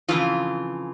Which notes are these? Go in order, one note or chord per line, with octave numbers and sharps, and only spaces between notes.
F2 C#3 E3 F3 F4